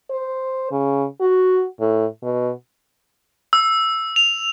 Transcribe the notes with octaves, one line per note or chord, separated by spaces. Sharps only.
C5
C#3
F#4
A2
B2
E6
F7